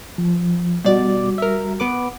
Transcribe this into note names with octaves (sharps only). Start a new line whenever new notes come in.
F3
B2 G3 F#4 D5
A#4 E5
B3 B4 D6